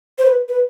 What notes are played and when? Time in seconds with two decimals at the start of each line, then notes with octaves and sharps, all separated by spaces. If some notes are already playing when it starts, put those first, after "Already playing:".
0.18 C5
0.26 B4
0.49 B4